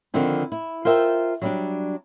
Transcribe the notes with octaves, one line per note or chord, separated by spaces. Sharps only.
D3 D#3 F3 C4 E4
E4
F4 A#4 C5 E5 G5
F#3 G3 D4